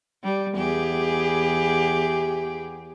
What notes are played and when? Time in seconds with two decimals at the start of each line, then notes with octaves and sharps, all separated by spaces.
0.24 G3
0.56 E2 G4 G#4